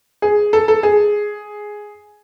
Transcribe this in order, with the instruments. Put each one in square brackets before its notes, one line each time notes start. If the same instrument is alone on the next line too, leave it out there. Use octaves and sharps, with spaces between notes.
[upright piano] G#4
A4
A4
G#4